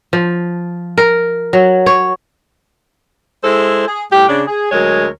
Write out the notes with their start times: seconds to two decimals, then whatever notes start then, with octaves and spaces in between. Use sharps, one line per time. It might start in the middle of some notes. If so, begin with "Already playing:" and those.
0.13 F3
0.97 A#4
1.53 F#3
1.86 C#5
3.44 G#3 E4 A4 C5
3.88 G#4
4.12 A2 G3 G4
4.28 C#3 D4
4.47 G#4
4.72 D2 F#3 G#3 A#4 C#5